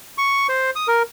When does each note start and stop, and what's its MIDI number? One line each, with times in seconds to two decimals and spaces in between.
0.18 0.47 85
0.49 0.70 72
0.76 0.88 87
0.88 1.03 70